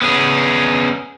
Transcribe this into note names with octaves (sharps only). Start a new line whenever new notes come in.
B3 C#4 G#4